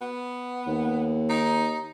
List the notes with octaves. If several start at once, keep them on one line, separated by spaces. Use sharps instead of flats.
B3
D#2
D#4